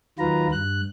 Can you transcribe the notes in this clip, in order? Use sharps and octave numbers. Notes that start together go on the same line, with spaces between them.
D#2 D#3 F#3 F4 B4 A#5
G2 F#6